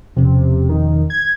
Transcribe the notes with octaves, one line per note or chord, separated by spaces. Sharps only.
E1 C3 F3 C#4
D#3
G#6